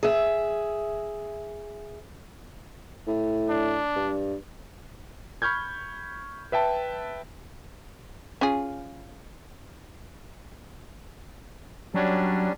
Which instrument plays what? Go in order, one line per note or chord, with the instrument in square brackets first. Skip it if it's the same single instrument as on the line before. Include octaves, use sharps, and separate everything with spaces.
[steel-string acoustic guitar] G#4 E5
[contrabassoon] A2
[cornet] D4
[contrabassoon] G2
[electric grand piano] B5 C#6 F6 G6 G#6
B4 E5 G5 A5
[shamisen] C#4 F4 G#4
[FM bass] F#3 [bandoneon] G3 C#4 D4